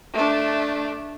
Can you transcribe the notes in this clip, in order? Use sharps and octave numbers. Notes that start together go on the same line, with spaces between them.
A3 D4